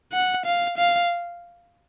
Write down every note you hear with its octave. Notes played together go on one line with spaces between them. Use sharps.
F#5
F5
F5